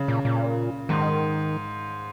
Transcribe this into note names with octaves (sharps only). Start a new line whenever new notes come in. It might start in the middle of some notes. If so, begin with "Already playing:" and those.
Already playing: C#3
A#2
A#2
G#2 D#3